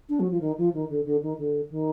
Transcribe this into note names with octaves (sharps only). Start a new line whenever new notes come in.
D4
F#3
F3
D#3
F3
D#3
D3
D3
D#3
D3
D#3